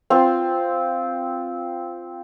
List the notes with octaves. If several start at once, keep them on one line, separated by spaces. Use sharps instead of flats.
C4 F4 C6